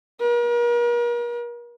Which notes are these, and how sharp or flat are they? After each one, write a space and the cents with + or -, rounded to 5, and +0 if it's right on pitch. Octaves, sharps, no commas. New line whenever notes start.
A#4 +40